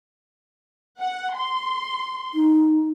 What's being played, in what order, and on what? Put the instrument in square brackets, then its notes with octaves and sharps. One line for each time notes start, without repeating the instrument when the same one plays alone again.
[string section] F#5
C6
[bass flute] D#4